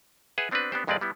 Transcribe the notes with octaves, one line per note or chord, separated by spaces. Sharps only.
G#4 B4 E5 F#5
B3 C4 D4 F#4 B4
B3 C4 D4 G4 C5
C2 F2 G#3 C4 B4 D5
G3 B3 E4